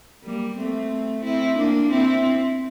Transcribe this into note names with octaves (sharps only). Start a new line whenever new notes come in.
G3 A#3
A3 C4
C4 E4
A#3 D4
C4 E4